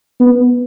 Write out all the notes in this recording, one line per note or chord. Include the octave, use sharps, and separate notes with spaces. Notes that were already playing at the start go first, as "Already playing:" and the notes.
B3